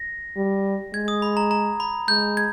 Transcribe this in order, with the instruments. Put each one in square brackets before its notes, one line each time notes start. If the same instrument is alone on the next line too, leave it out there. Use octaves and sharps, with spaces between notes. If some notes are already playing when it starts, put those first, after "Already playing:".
Already playing: [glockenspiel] A#6
[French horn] G3
[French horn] G#3 [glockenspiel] G#6
[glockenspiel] D#6
B5
A#5
A#5
B5
[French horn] G#3 [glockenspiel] G6
[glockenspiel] G#6